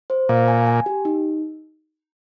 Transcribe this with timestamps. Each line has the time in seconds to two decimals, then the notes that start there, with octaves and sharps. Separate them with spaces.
0.10 C5
0.29 A#2 F5
0.48 G#5
0.67 G#5
0.86 G4
1.05 D#4